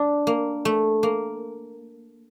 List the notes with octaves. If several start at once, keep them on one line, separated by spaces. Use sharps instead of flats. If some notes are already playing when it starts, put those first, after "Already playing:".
Already playing: D4
A#3
A3
A#3